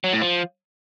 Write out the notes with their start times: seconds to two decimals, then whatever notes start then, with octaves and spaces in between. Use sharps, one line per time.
0.04 F#3
0.13 A2
0.22 F3